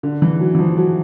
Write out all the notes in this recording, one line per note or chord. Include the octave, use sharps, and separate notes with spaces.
D3
E3
F#3
E3
F3
F#3